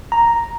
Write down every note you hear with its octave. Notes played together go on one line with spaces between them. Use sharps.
A#5